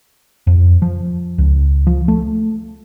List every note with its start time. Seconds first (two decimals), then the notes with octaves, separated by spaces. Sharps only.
0.47 F2
0.82 F3
1.38 C#2
1.87 F3
2.08 A3